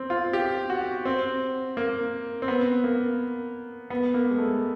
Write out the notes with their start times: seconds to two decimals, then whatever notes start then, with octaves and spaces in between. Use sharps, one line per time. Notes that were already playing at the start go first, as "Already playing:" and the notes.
Already playing: C4
0.10 F4
0.33 G4
0.70 F#4
1.05 C4
1.77 A#3
2.42 C4
2.48 B3
2.84 A#3
3.90 B3
4.14 A#3
4.31 G#3
4.38 A3